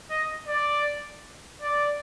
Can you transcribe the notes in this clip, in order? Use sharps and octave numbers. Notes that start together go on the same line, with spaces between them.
D#5
D5
D5